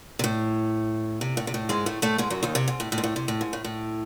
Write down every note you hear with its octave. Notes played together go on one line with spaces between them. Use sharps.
C3
A2
C3
A2
C3
A2
G#2 G#3
A2 A3
A2 A3
G#2 G#3
F#2 F#3
D#2 D#3
C3
G#2
A2
A2
G#2
A2
C3
A2
G#2
A2
A2